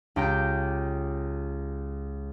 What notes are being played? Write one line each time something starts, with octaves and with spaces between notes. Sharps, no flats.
C#2 G4 G5 A#5 G6